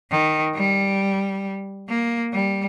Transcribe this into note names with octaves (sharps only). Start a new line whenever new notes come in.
D#3
G3
A#3
G3